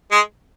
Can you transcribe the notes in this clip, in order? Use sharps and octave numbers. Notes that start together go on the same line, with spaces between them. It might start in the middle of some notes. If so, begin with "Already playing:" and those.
G#3